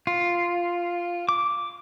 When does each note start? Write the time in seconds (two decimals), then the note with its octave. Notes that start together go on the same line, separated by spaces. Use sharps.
0.07 F4
1.29 D6